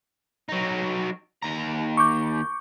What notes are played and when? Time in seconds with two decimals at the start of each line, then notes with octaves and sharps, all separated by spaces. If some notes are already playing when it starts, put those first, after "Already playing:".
0.49 F#3 D#4
1.42 D#2 A#5
1.97 C#6 D6 G6